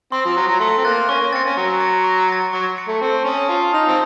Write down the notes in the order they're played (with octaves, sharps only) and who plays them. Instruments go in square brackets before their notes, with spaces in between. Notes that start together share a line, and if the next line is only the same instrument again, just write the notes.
[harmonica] C4 [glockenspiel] C6
[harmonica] F3
[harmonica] F#3 [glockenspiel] F#6 A6
[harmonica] F#3
[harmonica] A3 [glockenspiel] C6
[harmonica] C4
[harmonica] A#3 [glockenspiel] F#6 A6
[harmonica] C#4 [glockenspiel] C#6
[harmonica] A#3
[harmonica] C4 [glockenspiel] A6 C#7
[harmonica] C#4
[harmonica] F#3 [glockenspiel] C#6
[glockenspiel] A6 C#7
C#6
A6 C#7
[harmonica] F#3 [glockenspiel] C#6
[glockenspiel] A6 C#7
[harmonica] A3
[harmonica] C4 [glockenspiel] A5
[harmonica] C#4 [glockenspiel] D#6 A6 C#7 F7
[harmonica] F4 [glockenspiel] A5
[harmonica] D#4 [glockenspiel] D#6 A6 C#7 F7
[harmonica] C4